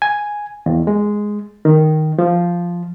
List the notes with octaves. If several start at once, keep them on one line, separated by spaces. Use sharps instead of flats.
G#5
E2
G#3
D#3
F3